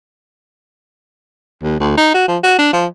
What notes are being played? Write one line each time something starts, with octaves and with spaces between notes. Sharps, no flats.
D#2
D2
D#4
F#4
F3
F#4
D4
F3